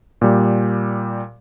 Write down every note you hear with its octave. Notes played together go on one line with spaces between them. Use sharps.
A#2 G3